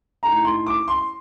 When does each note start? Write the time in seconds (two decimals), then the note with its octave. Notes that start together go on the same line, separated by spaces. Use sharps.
0.23 A2 A3 D#4 A#5
0.45 C6
0.66 D6
0.88 C6